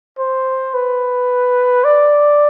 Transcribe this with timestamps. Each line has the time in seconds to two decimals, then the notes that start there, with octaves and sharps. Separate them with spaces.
0.19 C5
0.74 B4
1.84 D5